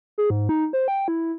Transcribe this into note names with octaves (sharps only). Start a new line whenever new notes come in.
G#4
G#2
D#4
C5
G5
E4